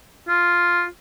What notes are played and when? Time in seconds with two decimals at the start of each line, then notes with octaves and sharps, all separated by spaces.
0.28 F4